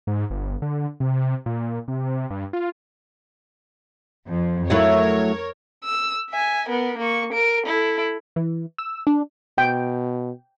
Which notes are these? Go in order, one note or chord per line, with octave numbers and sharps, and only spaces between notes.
G#2
G1
D3
C3
A#2
C3
G2
F4
F2
F#3 A3 E4 A#4 C#5
E6
E5 G#5
B3 A#4
A#3 C#6
A#4 D7
E4 A4
E3
E6
D4
B2 G5